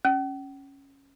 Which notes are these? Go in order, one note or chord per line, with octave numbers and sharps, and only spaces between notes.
C#4